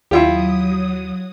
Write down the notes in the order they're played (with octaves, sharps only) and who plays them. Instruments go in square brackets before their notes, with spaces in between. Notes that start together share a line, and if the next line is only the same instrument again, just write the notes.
[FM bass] D#2 [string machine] F#3 D#6 [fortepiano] E4 F4 G4